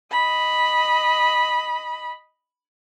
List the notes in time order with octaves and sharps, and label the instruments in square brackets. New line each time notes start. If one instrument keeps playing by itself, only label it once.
[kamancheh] D#5 B5